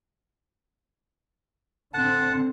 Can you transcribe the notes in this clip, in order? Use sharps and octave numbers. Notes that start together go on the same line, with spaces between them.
D3 C4 F#5 A5